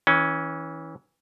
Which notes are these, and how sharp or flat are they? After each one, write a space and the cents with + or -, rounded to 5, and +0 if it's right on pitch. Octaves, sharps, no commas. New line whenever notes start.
E3 -25 C#4 +0